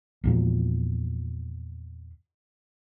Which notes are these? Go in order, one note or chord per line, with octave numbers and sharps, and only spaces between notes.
E2 A#2 F3